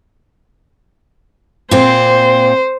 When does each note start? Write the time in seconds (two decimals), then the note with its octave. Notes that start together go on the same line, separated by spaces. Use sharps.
1.71 A#2 C4 C5